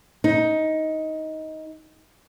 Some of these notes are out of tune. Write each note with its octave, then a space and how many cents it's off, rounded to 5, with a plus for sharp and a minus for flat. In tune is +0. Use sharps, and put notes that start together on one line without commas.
D#4 +15